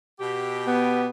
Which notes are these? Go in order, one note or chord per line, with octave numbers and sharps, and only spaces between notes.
B2 G4
B3